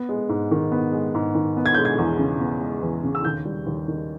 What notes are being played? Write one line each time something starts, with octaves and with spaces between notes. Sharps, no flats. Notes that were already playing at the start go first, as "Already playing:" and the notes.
Already playing: B3
G#3
G#2
D#3
B3
G#3
G#2
D#3
B3
G#6
G#3 G6
G#6
E2
C#3
B3
G#3
E2
C#3
E6
D#2 G6
G3
D#2
D#3